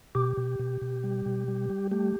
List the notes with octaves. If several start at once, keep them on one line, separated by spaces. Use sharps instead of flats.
B2 G4
B2
B2
B2
G3
B2
G3
G3
A3 G4